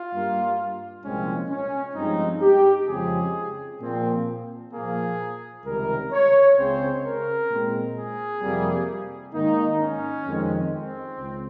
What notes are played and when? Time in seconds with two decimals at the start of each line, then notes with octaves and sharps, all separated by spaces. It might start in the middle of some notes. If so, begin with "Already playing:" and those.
Already playing: F4
0.11 G2 G3 A#3
1.03 C2 A#2 F3 G#3 C4 C#4
1.50 C#4
1.96 G2 F3 G#3 C4 D#4
2.42 G4
2.88 F2 C#3 F3 G#3 C4 G#4
3.80 A#2 F3 C4
4.73 A#2 F3 A#3 G#4
5.65 C#2 C3 D#3 G3 A#4
6.12 C#5
6.57 C#2 C#3 G#3 C4 C5
7.04 A#4
7.50 A#2 G#3 C4
7.96 G#4
8.42 F2 C3 G3 A#3
9.34 G#2 D#3 A#3 D#4
9.80 C#4
10.26 F2 D#3 G#3 C4
10.73 C4
11.19 C#2